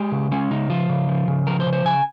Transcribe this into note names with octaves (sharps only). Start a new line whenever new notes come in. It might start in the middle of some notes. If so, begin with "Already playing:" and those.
Already playing: G#3 G4
C#3
G#3 C#4
C#3 D#4
F3 F4
C#3
F3
C#3
F3 A#4
C5
C#3
C5
C#3 G#5